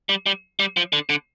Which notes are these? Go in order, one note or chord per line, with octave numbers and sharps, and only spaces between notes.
G3
G3
G3
F3
D3
D3